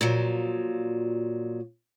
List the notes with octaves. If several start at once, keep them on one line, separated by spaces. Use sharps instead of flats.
A#2 F3 F#3